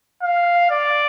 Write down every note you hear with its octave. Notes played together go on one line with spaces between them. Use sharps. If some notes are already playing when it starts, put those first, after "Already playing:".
F5
D5